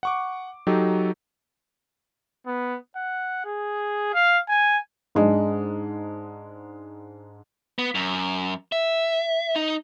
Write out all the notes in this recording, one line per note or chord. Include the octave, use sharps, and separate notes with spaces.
F#5 C#6 D6
F#3 D#4 G4 A4
B3
F#5
G#4
F5
G#5
G#2 G#3 D4
B3
F#2
E5
D#4